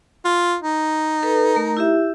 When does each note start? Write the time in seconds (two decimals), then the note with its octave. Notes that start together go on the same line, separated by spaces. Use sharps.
0.25 F4
0.63 D#4
1.23 A4 B4
1.54 A3 A#4 A#5
1.77 E4 G4 E5